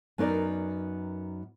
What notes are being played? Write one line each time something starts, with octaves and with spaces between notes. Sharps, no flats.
F#2 B3 D#4 A#4 D5